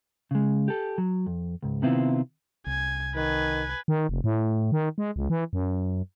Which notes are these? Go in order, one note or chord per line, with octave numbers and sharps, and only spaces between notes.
C#3 G#3
G4 A4
F#3
F2
C#2 G#2
C3 D#3 B3 C4 E4 F4
C2 G#5
D#3 B4 G#5
D#3
F1
A2
D#3
G#3
C#2
E3
F#2